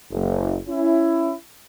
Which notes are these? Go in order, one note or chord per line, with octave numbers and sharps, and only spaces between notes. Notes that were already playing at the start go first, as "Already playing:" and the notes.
F#1
C#4 E4